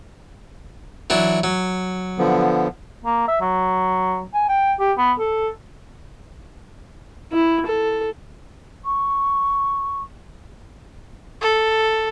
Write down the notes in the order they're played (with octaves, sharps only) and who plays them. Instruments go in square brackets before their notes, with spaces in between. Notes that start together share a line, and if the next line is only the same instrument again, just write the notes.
[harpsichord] E3 F#3 D4
F#3
[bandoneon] D3 F3 B3
[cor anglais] A#3
E5
F#3
G#5
G5
G4
B3
A4
[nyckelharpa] E4
A4
[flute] C#6
[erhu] A4